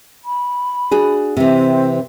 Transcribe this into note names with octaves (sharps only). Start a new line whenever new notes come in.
B5
D4 F#4 G#4
C3 E3 C4